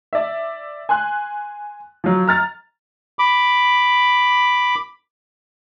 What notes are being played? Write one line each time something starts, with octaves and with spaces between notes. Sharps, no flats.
D5 E5
G#5 C6 F#6
F3 F#3
A#5 F6 A6
B5 D6